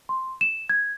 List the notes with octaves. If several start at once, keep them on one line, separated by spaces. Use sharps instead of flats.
C6
E7
G#6